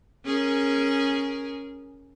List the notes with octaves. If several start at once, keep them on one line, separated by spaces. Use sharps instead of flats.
C#4 G#4 A#4